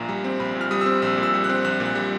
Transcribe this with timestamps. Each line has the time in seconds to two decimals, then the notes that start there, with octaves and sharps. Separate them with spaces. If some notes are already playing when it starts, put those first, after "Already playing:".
Already playing: A#1 A#2 A#5
0.09 G3
0.24 C4
0.40 A#1 B5
0.56 A#2
0.61 F6
0.71 G3 D#6
0.81 C4 E6
1.02 A#1 E6
1.17 A#2
1.23 E6
1.34 G3
1.44 F#6
1.49 C4
1.64 A#1 F#6
1.80 A#2
1.85 F#6
1.95 G3